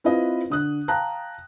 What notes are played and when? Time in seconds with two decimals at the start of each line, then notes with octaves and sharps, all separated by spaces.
0.04 C4 E4 F4 B4 D#5 F5
0.50 D3 D#6 F#6
0.88 F5 G5 A5 A#5 F#6